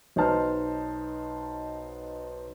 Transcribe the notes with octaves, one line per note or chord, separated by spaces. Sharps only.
B1 D#4 B4 C5 A5 F6